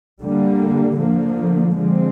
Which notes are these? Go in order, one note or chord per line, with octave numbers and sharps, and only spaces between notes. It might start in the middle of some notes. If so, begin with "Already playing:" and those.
D3 G3 A#3
D3 F3 A#3
D3 F3 G#3 C4